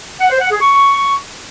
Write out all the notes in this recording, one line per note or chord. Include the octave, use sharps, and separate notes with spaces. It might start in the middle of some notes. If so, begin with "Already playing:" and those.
F#5
C5
F#5
G#4
C#6